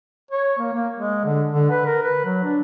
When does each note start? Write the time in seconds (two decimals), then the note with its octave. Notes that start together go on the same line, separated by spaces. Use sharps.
0.31 C#5
0.58 A#3
0.73 A#3
0.95 G#3
1.24 D3
1.52 D3
1.70 B4
1.85 A#4
2.03 B4
2.25 F#3
2.43 D4